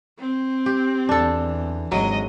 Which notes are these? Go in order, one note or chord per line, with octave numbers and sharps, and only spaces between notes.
C4
G4
E2 E3 D4 A4
G#1 F#3 G#3 D#5